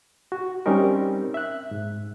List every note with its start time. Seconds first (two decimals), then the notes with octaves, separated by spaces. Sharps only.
0.32 F#4
0.66 G3 C4 C#4 D#4 A#4
1.34 E5 F#6
1.71 G#2